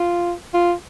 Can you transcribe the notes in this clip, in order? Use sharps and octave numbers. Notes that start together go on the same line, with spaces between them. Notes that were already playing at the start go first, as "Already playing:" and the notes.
Already playing: F4
F4